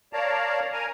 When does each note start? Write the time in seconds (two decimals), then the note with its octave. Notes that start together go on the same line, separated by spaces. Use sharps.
0.13 A#4 C#5 D5 F5 A5 A#5
0.72 A#4 G#5 A#5